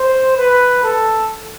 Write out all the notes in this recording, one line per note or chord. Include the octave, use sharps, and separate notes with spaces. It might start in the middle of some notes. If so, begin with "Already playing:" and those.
Already playing: C5
B4
A4